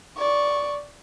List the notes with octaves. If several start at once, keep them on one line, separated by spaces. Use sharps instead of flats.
D5 C#6